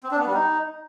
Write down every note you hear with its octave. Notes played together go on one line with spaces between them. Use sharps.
C4
D4
B3
G3
D#4